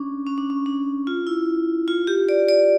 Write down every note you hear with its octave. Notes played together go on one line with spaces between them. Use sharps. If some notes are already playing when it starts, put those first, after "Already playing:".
Already playing: C#4 D4
C#4
D4
C#4
D4
F4
E4
F4
G4
D5
D5